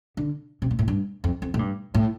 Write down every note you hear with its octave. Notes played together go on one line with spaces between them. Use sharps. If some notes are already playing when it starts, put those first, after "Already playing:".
D3
C3
A#2
A2
G2
F2
F2
A2
G2
A2